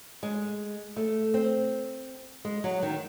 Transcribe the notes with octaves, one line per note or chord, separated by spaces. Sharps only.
G#3
A3
C4
G#3
F#3
D#3